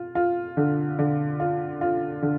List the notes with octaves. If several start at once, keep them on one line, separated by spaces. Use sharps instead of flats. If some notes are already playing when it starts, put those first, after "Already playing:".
Already playing: F4
F4
D3
D3
F4
F4
D3